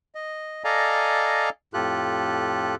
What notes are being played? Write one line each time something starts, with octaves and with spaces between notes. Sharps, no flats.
D#5
A4 D5 D#5 F5 G#5 A#5
F2 A2 F4 G4 A4 F#6